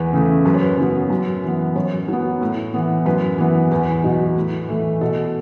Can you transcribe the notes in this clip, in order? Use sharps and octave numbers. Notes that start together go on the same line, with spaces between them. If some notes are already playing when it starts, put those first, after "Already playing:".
Already playing: E2 B4
C#3 A3
F#2 B4
C#5
B4
C#3 F#3 B3
F#2
E3 B3
F#2 C#5
F#3 B3
A2
E3 B3
F#2 B4
E3 B3
E2 B4
B2 F#3
A2
E3 A3
B2 A4